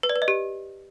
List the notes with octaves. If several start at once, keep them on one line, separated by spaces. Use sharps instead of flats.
B4
D5
B4
D#5
G4